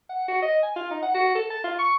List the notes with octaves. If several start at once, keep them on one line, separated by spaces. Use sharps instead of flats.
F#5
F#4
D#5
G#5
F4
D#4
F#5
F#4
A4
A5
F4
C#6